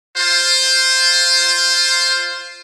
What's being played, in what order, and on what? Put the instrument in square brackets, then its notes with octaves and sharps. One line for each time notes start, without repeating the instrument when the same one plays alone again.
[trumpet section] F4 C5